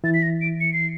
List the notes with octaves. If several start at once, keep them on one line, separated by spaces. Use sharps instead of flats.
E3 E4 A6
B6
A#6
D7
C#7
C7